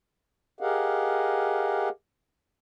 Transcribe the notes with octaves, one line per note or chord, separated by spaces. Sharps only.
G4 G#4 A#4 D#5 F5 F#5